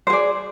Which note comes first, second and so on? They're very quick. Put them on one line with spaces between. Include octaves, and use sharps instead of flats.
C5 G#4 D5